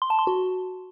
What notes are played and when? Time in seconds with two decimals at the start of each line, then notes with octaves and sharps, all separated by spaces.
0.02 C6
0.10 A5
0.19 C6
0.27 F#4